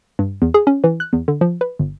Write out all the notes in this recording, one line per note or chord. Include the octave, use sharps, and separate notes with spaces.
G2
E2
G#4
C#4
E3
F#6
E2
D3
F3
B4
G1